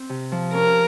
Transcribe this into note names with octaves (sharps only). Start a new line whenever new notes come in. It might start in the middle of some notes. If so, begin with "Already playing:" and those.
Already playing: C4
C3
F3
C#4 A#4